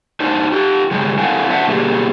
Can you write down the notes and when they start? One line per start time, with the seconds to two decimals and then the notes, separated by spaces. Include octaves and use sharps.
0.20 D4 D#4 C5
0.52 F4 G4
0.91 G2 C#3 G3 G#3
1.18 C4 E4 A4 F5 F#5 G#5
1.50 D4 C5 E5 F#5
1.67 B2 G3 A3 A#3 G4 G#4